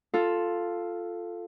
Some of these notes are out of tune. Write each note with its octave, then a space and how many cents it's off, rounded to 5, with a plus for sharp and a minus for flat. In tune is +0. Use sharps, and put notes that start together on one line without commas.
F4 +0 A4 +0